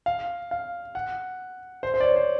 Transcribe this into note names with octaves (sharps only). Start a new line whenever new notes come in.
F5
F5
F#5
C5
C5
D5
C#5
C5